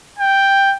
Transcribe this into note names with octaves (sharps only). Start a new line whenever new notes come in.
G5